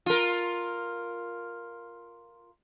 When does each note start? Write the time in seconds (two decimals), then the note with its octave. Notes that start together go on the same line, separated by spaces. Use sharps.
0.06 F4 A#4